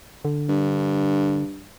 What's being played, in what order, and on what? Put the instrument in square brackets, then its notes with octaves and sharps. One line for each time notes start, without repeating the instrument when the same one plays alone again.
[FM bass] D3
[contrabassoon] G2